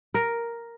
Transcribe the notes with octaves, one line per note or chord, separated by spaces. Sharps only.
A#4